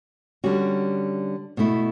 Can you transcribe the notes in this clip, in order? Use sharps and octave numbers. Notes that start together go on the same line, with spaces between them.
D3 G3 C#4 F#4
B2 A3 E4